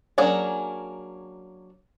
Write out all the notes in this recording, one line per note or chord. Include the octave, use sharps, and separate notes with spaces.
F#3 A#3 C#4 D4 G#4